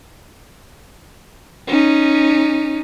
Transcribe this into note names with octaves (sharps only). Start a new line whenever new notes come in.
C#4 D#4